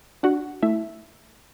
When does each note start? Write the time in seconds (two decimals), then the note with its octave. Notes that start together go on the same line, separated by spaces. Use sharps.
0.23 D4 F#4 F#5
0.62 A3 E4 E5